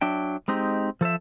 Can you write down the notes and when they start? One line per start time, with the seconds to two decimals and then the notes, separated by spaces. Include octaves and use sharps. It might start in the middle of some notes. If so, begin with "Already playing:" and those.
0.01 F#3 D4 E5 G5
0.48 G#3 C4 D#4 G4
1.01 F3 A4 C5 E5